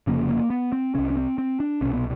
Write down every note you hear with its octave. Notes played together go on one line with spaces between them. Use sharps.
F1 F2 C#3 A#3
A#3
B3
C4
C2 C3 C#4
C#4
C4
C4
D4
C2 B2 C#4
B3